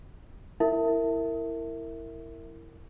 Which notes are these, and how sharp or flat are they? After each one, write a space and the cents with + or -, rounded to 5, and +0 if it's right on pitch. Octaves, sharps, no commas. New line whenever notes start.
E4 +0 A#4 -25 E5 +0